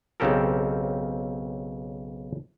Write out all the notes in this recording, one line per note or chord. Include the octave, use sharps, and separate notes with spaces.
B1 C#3 C4 G4 A4 A#4